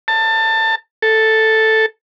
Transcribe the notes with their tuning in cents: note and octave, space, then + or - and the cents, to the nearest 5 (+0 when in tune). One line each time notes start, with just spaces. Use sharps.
A5 +20
A4 +0